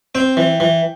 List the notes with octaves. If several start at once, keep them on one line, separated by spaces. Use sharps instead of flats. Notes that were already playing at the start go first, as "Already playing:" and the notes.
C4 G5
E3
E3